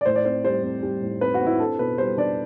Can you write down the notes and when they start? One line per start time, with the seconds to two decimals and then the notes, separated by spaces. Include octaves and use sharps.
0.01 D5
0.06 A2 C5
0.16 D5
0.25 C4 C5
0.44 G3 C5
0.63 C4
0.83 G3
1.02 A2
1.21 C4 B4
1.34 F#4
1.40 C4
1.46 E4
1.60 D4 A4
1.79 B2 B4
1.98 G3 C5
2.17 D4 D5